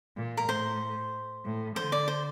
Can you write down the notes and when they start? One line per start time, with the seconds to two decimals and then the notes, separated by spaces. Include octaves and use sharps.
0.17 A#2
0.37 A#4
0.49 A2 C5
1.45 A2
1.76 D3 C5
1.92 D5
2.08 C5